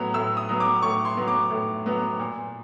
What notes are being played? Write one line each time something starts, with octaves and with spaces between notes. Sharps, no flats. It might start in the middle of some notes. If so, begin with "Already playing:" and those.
Already playing: A2 F#3 B3
A2 E6
D#6
F#3 B3
D6
A2 C#6
C6
F#3 B3
D6
A2
F#3 B3
A#2